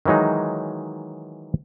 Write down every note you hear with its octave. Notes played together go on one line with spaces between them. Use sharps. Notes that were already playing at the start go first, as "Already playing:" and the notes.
D#3 E3 F#3 G#3 D#4